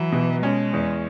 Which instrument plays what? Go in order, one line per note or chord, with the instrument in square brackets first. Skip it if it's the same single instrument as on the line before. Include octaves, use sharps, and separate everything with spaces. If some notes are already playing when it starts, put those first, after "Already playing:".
Already playing: [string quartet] E3 [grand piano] F#3
[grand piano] B2
[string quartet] G#3 [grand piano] C#4
[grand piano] E2